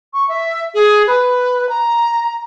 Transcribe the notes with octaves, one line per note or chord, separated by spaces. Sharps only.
C#6
E5
G#4
B4
A#5